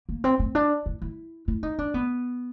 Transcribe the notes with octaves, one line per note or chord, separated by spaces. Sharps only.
A#3
C4
C4
D4
E4
E4
E4
D#4
D4
B3